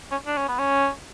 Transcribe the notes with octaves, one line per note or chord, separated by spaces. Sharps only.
C#4
D4
C#4
B3
C#4